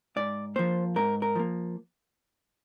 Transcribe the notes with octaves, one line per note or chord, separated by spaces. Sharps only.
G#2 D5
F3 A#3 C5
G#2 A#4
A#4
F3 A#3